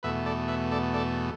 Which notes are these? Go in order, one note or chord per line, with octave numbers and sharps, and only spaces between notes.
E2 B2 A3 B4 E5
A4 D5
B4 E5
A4 D5
A4 D5